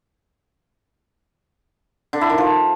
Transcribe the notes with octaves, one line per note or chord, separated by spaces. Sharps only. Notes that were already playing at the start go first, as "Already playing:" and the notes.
D3
E4
D#3
F3